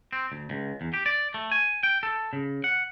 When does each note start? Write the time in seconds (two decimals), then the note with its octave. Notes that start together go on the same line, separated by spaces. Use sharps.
0.13 C4
0.32 D2
0.50 C#2
0.81 E2
0.94 G4
1.06 D5
1.34 A3
1.51 G#5
1.83 G5
2.03 A4
2.33 C#3
2.64 F#5